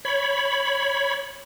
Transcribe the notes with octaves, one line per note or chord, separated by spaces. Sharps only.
C#5 B5